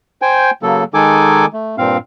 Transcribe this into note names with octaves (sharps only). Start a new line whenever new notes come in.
C5 G5 G#5
C#3 F#3 A#3 A4
D#3 G#3 D#4 A4 G#5 D6
A3
G2 A#2 C4 F5